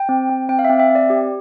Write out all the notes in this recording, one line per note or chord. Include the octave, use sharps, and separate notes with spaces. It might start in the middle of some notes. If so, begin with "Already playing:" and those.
Already playing: G5
C4
C4
C4 G5
F5
C4 E5
E5
C4
D5
G4